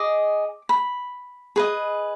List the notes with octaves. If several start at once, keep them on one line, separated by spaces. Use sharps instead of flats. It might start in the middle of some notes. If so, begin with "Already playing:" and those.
Already playing: G#4 D#5 D6
B5
G#4 B4 D#5